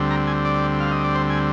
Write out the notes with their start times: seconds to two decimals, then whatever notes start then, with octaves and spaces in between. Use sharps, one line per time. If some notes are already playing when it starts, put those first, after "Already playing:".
Already playing: D2 D3 G3 C4
0.10 A#5
0.27 G#5
0.45 D5
0.80 F5
0.91 D#5
1.04 D5
1.15 C5
1.30 G#5